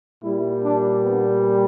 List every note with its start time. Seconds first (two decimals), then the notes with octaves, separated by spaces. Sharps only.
0.20 A#2 G3 E4
0.61 D4
1.01 B3